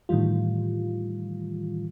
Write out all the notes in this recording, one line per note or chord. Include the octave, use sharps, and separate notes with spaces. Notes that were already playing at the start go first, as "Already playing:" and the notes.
A2 D#3 E3 G3 F4